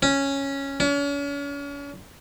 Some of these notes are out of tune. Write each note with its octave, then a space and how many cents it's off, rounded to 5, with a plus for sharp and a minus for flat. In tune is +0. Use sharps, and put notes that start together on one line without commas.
C#4 -5
C#4 +40